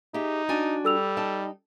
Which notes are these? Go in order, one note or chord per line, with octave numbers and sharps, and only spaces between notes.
D#4 G4 G#4 E5
D4 F#4 G#5
G3 A4 E6 F7
D#4 G5 A5